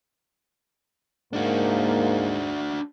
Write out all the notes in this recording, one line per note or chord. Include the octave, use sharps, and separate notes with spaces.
G#2 A#3 D4 F#4